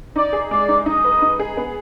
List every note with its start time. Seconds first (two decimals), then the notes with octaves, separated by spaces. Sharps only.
0.16 D#4 D5
0.33 G#4
0.51 G#3 D5
0.68 D#4
0.86 D#4 D#5
1.04 B4
1.22 D#4
1.40 G#4
1.57 B3